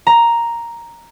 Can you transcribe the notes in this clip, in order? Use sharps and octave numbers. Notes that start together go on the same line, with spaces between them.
A#5